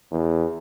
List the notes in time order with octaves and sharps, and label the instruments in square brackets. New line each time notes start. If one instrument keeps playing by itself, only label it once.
[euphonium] E2